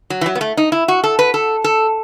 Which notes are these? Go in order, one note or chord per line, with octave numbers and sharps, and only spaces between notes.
F#3
E3
F#3
B3
A3
D#4
E4
F#4
A4
B4
A4
A4